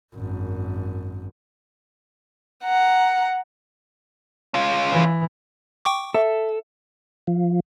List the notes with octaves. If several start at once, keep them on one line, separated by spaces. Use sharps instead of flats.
G#1 F#2
F#5 A#5
C#4 F4
E3
G5 C#6 D6
A4 E5
F3